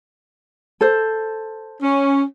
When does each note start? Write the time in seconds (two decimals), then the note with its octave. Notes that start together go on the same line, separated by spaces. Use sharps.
0.81 A4 C5
1.82 C#4